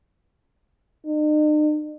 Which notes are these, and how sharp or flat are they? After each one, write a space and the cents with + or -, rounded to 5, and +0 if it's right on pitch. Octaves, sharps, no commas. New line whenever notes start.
D#4 -45